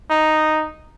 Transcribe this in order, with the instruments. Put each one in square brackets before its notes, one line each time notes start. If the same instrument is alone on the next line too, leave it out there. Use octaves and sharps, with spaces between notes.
[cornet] D#4